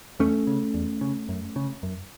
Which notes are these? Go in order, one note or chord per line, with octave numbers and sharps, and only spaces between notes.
E2 A3 C#4
C#3
E2
C#3
F#2
C#3
F#2